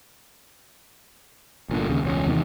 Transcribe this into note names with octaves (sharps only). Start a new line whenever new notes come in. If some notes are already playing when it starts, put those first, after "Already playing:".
G1 A#2 D3
D#2 C#3
E1 C#2 C#4
E2 C3 D#3